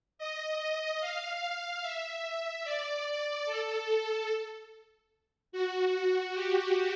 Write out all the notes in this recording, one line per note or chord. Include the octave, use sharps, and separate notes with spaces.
D#5
F5
E5
D5
A4
F#4
G4